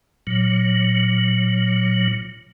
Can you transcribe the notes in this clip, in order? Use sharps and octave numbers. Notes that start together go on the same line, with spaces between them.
A#2 F#3